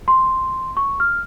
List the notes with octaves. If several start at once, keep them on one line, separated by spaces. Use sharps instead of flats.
C6
C#6
F6